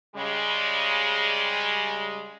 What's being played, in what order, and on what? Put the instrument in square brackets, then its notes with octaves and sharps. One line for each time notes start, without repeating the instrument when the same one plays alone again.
[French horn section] C#3 G3 G#3